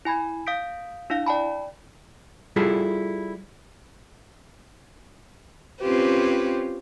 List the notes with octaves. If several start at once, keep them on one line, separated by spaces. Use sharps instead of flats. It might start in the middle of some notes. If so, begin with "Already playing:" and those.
E4 G#5 B5 G#6
F5 D#6 G6 B6 D7
D4 E4 F5
D5 G5 A5 B5
G3 E4 F4 G#4 A4
C4 C#4 F4 G4 B4 C5